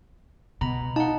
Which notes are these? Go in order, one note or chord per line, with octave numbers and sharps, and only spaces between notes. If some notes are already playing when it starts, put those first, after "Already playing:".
B2 A#5 B5
D#4 F#5 A5